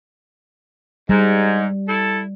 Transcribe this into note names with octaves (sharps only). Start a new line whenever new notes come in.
G#2 G3
E4 A4